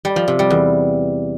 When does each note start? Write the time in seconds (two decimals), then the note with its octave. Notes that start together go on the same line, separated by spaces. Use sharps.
0.05 G3
0.16 F3
0.28 C3
0.39 G3
0.50 E2